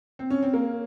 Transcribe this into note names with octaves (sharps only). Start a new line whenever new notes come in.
C4
C#4
C4
A#3